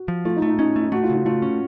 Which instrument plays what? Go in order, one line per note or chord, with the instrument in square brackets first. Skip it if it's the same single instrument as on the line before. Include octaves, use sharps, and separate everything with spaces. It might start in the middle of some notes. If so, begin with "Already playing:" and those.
Already playing: [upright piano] F#4
[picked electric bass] F3
[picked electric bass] A3 [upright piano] F4
[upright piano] D#4
[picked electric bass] A3
[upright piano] D#4
[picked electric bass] C#4 [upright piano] D#4
[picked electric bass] A3
[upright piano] D#4
[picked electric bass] A3 [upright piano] F#4
[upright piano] F4
[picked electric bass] C#3
[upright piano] F4
[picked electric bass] A3 [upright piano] F4
[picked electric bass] C#4